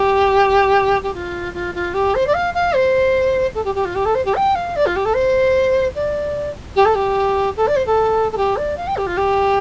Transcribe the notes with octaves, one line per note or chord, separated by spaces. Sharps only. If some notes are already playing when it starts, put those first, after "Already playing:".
Already playing: G4
G4
F4
F4
F4
G4
C5
D5
F5
F5
C5
A4
G4
G4
F4
G4
A4
C5
G4
G5
F5
D5
F4
G4
A4
C5
D5
G4
A4
G4
A4
D5
C5
A4
A4
G4
D5
F5
G5
G4
F4
G4